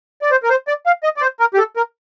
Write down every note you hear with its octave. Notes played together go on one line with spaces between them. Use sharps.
D5
C5
A#4
C5
D5
F5
D#5
D5
C5
A#4
G4
A4
A#4